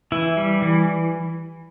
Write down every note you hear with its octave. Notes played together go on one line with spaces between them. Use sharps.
E3 E4
G3
E3